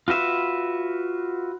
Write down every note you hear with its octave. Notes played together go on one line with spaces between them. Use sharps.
F4 F#4 B4 E5